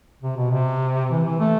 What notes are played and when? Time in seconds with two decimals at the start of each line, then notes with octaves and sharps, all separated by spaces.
0.22 C3
0.37 B2
0.51 C3
1.10 E3
1.25 E3
1.40 A3